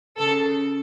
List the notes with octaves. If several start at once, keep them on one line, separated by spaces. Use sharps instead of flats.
C#3 A4